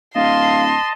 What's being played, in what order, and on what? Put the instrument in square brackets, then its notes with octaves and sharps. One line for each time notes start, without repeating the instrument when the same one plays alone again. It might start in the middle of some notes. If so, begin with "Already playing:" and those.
[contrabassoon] D1 [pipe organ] D#5 A5 [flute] F5 [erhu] C6